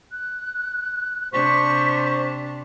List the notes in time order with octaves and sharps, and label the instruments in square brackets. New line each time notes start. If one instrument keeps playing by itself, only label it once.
[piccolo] F#6
[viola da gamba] C3 D4 [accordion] C5 [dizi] C#6 [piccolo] B6